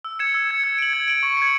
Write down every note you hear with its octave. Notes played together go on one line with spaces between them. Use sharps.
E6
G#6 C#7 E7
E6
G#6 C#7 E7
G#6
D7 F#7
G#6
D7 F#7
C#6
G#6 C#7